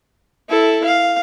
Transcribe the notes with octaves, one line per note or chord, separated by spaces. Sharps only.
E4 A4
F5